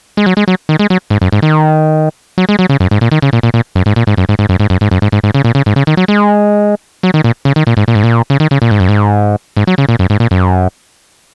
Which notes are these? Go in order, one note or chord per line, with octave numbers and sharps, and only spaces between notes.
G#3
F#3
G#3
F#3
D#3
G#3
F#3
G#2
F#2
G#2
D#3
F#3
G#3
F#3
C#3
F#2
G#2
A#2
D#3
C#3
A#2
A#2
A#2
F#2
G#2
A#2
G#2
F#2
G#2
G#2
F#2
G#2
F#2
G#2
F#2
G#2
G#2
G#2
C#3
A#2
C#3
G#2
C#3
D#3
F#3
G#3
F#3
D#3
A#2
C#3
D#3
A#2
G#2
A#2
G#2
A#2
C#3
D#3
C#3
A#2
G#2
F#2
G#2
G#2
F#3
C#3
A#2
F#2
G#2
A#2
F#2